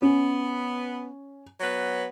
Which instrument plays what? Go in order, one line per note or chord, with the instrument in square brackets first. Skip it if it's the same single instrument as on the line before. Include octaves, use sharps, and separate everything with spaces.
[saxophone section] B3 [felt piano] C#4
[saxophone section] F#3 B3 B4